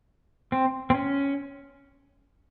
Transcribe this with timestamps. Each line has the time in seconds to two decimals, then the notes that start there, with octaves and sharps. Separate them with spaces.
0.52 C4
0.90 C4
0.94 C#4